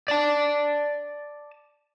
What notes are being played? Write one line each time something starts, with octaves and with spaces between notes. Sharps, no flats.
D5 A5